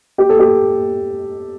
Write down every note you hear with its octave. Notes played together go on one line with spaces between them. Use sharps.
G4
A4
G4